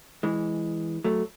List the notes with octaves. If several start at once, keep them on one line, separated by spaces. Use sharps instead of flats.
E3 G#3
F#3 A3